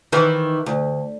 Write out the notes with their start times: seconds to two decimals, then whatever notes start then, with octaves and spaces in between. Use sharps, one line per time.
0.12 D#3 E3
0.66 D2